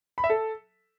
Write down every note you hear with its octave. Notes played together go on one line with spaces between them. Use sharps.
B5
E5
A4